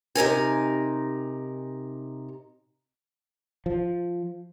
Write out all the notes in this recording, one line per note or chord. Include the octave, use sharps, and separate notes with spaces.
C3 D#4 A#4 G#5
F3